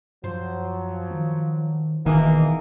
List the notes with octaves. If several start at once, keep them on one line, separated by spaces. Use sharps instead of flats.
F#2 F3 F#3 C5
D#3
D1 B2 D#3 E3 A#3 G#4 B5